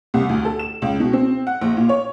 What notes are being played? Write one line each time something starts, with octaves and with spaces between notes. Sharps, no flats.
C2
D2
A4
E7
C#2
B2
C4
F#5
A#1
A#2
C#5